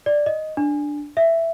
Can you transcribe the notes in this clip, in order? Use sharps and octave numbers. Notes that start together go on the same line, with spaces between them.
D5
D#5
D4
E5